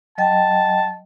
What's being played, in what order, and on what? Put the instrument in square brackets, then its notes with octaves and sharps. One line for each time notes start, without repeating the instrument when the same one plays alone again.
[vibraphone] F#3 D#5 G5 [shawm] A5